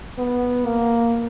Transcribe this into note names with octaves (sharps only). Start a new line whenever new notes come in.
B3
A#3